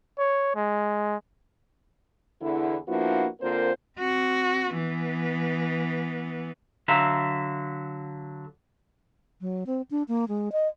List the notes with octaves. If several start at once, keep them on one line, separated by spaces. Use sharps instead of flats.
C#5
G#3
E2 D3 E4
F3 A#3 B3 D4 E4 F#4
D3 A#3 C4 F4 A#4 C5
C4 F#4
E3 B3
D3 F#3 E5 F5 A#5
F#3
C4
D4
A#3
G#3
D#5